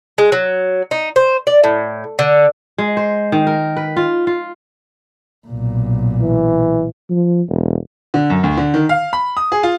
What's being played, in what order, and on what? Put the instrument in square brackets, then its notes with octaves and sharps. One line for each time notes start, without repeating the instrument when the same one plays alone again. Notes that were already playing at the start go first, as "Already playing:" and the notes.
[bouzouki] G#3
F#3
D#4
C5
D5
A2
D3
[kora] G#3
C5
D#3
A#4
B4
F4
F4
[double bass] B1 A#2
[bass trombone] E3
[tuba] F3
E1
[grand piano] D3
F#2
D2
D3
D#3
F5
B5
D#6
G#4
F4